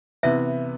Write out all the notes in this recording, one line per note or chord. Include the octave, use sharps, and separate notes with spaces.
C3 E3 B3 E5